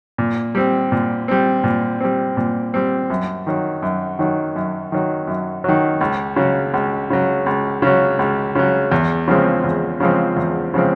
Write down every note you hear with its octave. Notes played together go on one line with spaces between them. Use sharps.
A#2
G3 C4
A#2
G3 C4
A#2
G3 C4
A#2
G3 C4
F#2
D#3 F#3
F#2
D#3 F#3
F#2
D#3 F#3
F#2
D#3 F#3
C#2
C#3 F#3
C#2
C#3 F#3
C#2
C#3 F#3
C#2
C#3 F#3
E2
C#3 F3 G#3 C4
E2
C#3 F3 G#3 C4
E2
C#3 F3 G#3 C4